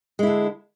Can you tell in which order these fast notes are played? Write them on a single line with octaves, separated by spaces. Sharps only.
G#3 E4 D3